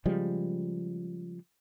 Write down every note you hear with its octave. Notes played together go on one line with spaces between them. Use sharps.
C#3 F3 G3 G#3